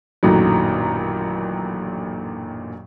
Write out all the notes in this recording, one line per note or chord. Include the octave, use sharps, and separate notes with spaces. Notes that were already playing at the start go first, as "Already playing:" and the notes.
A1 F#2 A#2 D3 D#3 F#3